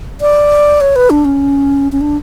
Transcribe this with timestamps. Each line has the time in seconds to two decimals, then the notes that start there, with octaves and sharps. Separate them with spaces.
0.21 D5
0.81 C#5
0.96 B4
1.10 D4
1.25 C#4
1.92 C#4
2.01 D4